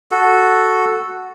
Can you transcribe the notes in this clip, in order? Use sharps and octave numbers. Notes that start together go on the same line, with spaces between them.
F#4 A4